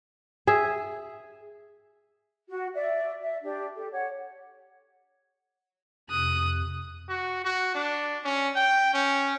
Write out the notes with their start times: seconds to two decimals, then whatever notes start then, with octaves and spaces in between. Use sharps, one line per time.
0.47 G#4 E5
2.48 F#4
2.74 D5 E5
3.21 E5
3.44 D4 G4 D5
3.75 G4 A4
3.91 C#5 F#5
6.10 F2 C3 D#6 F#6
7.09 F#4
7.44 F#4
7.74 D4
8.24 C#4
8.55 G5
8.93 C#4